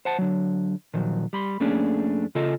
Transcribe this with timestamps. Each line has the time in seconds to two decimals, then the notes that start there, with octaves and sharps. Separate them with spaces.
0.05 C5 F#5 A5
0.18 D3 F#3
0.94 A#2 D#3 F3 F#3
1.33 G3 B5 C6
1.60 F2 A3 A#3 C#4 D4 G#4
2.35 C#3 F4 A4 D#5